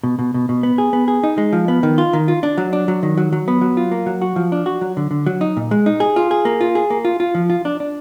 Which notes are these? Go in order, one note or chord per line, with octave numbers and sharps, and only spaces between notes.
B2
B2
B2
B2
B3
G#4
B3
G#4
D#4
G#3
F3
B3
D#3
F4
D#3
F4
D4
F#3
D4
F#3
D#3
F#3
F#3
B3
F#3
F4
A#3
F#3
F#4
F3
D4
F#4
F#3
D3
D3
F#3
D#4
A#2
G#3
D#4
G#4
F4
G#4
A#3
F4
G#4
A#3
F4
F4
F3
F4
D4
D4